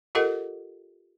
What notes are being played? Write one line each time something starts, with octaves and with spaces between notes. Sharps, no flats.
F4 G4 A4 A#4 D#5 F#5